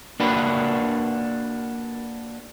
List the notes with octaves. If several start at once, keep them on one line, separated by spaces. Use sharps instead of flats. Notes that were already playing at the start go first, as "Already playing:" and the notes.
A#3 D4 F#4 B4